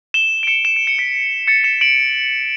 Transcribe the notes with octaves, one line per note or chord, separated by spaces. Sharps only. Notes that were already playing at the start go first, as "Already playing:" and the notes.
E7 G7
D7
C#7 E7
E7
D7
C#7
B6 D7
A6 C#7
C#7 E7
D7 F#7